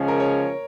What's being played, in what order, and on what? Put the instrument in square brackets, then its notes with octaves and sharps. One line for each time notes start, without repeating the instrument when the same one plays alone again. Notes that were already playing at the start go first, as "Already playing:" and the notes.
Already playing: [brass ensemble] C#3 F3 G#3 C#4
[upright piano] A#4
C#5